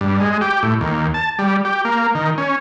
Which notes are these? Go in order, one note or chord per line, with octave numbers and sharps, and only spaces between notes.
G2
G#3
G4
A2
D#2
A5
G3
G4
A#3
D#3
C#4